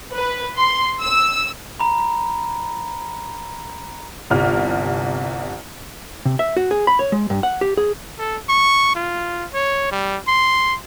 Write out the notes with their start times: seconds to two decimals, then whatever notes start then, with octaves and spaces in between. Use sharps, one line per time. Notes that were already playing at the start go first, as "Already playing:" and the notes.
0.12 B4
0.56 C6
1.00 E6
1.80 A#5 B5
4.30 G1 C2 F6
6.25 C3
6.39 E5
6.57 F#4
6.71 G#4
6.87 B5
6.99 C#5
7.12 G#3
7.30 G2
7.43 F#5
7.61 G4
7.77 G#4
8.19 A4
8.49 C#6
8.95 F4
9.54 C#5
9.92 G3
10.28 C6